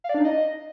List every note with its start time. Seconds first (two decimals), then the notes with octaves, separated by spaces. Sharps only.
0.04 F5
0.09 D5
0.15 D4
0.20 D#4
0.25 D#5